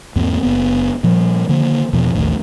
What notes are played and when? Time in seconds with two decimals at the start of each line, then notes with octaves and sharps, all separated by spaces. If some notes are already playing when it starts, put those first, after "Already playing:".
0.16 E2 G#2 A#3 C4
0.43 F#1 B3
1.03 A#2 F3 G3
1.49 D3 D#3 A#3
1.93 E2 B2 F3
2.15 A1 D#2 A2